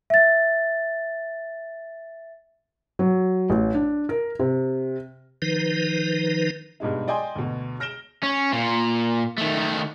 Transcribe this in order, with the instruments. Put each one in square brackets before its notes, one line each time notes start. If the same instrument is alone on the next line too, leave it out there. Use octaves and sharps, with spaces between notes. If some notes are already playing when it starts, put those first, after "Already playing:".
[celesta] E5 A6
[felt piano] F#3
A1
D4
A#4
C3
[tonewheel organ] D#3 F3 D#4 B4
[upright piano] G2 B2 G#3 D#4
D5 D#5 G5 G#5 C6
D2 B2
F6 A#6 D7 E7 G7
[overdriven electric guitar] C#4
A#2
D#3 A3